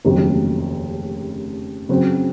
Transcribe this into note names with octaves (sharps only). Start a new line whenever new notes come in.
F1 D#2 C#3 F#3
C#3 F#3 C4 F#4 C5